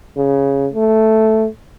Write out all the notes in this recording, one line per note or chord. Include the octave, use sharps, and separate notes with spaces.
C#3
A3